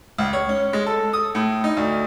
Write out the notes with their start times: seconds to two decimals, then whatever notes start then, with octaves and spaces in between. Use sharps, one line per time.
0.18 C#2
0.33 C#5
0.49 C#4
0.73 G#3
0.86 A4
1.13 D#6
1.35 A2
1.64 D#4
1.77 D2